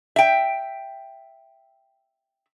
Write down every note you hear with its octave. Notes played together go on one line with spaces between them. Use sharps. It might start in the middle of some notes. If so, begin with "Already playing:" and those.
E5 G5